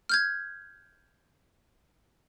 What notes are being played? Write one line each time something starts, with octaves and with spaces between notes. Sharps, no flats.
F6 G6 G#6